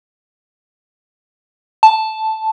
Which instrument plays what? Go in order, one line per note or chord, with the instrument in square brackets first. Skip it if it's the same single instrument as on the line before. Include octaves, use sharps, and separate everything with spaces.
[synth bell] A5